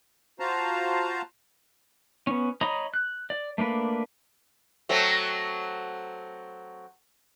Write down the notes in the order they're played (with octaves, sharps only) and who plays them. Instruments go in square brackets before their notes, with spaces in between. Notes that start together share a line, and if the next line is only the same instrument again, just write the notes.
[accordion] F4 F#4 C5 F5 A5 A#5
[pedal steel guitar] B3 C#4
C#5 D#5 A#5 B5 D#6
F#6
D5
A3 A#3 D4 B4
[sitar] F#3 A3 C4